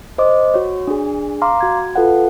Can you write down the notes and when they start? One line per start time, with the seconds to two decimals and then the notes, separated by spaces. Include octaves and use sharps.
0.18 C5 D#5 D6
0.54 F#4 C#5
0.87 D4 G#4
1.42 F5 A#5 C6 D6 F6
1.61 F#4 G#6
1.96 F4 A4 B4 F5 F#5